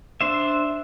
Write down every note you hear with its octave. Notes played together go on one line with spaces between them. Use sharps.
D4 C5 E5